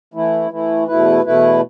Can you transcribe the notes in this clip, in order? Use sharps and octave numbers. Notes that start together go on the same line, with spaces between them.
E3 A3 E4
E3 A3 E4
E2 B2 A3 E4 B4
E2 B2 A3 E4 B4